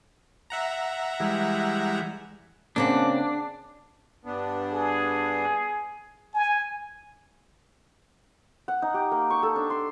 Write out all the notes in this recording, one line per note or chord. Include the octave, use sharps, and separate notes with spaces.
E5 F#5 A#5
E3 G3 G#3
C#3 A#3 C4 D4 F#5
G2 B3 D4
G#4
G#5
F#5
D#4
G4
A#3
C#6
A4
D4
C6